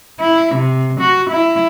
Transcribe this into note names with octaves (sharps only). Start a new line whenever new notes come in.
E4
C3
F#4
E4